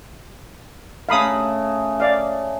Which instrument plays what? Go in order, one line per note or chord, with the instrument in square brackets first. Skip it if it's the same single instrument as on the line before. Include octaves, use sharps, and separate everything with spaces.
[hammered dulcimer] C#3 A3 A#5 [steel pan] F5 B5 D#6
[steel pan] D5 F5